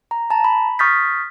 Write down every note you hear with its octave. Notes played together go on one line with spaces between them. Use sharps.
A#5
A5 A#5
B5
C#6 D#6 F6 G6 A6 B6